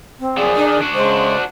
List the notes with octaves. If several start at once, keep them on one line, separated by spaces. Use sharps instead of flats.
C4
F#2 F3 G#4 D5
D#3 D4
D4 F#4
C#3 G#3 C5